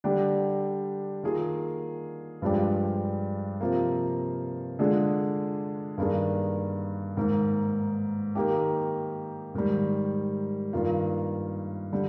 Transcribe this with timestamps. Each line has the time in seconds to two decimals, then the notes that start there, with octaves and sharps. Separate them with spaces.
0.04 D3 G3 D4 G4
1.23 D#3 A#3 F4 G#4
2.42 G2 F3 G#3 D4 G4
3.61 C3 F3 A#3
4.79 D3 G#3 D4 F4 G#4
5.98 G2 D#3 A#3 D4 G#4
7.17 G#2 D#3 A#3
8.35 D#3 A#3 D#4 G4
9.54 G#2 D#3 G3
10.73 G2 D#3 A#3 F4
11.92 D3 G3